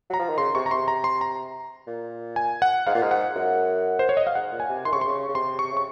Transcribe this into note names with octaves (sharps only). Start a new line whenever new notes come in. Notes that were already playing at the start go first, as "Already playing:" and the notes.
F#3 A#5
F3
D#3
C#3 C6
C3 C#6
A#5
C3 C6
A#5
C6
A#5
A#2
G#5
F#5
G#2 F5
A#2
G#2
F#5
F#2
C5
C#5
D#5
F5
G#2 F#5
A#2
G#5
C3
D#3 C6
C#3 C#6
C3 C6
C#3 C#6
C#3
C3 C6
C#6
C#3 C#6